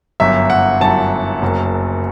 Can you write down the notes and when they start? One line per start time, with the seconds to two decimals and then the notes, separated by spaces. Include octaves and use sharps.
0.20 G1 F#2 F#3 E5
0.50 F#5
0.81 G1 F#2 F#3 A5
1.42 F#1 F#2 F#3